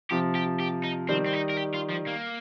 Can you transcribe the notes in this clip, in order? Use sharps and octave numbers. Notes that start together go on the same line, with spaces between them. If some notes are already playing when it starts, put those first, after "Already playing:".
C3 F3 G4
G4
G4
D#4
D#3 G3 C4
C4
D#4
A#4
G4
F4
F3
A#3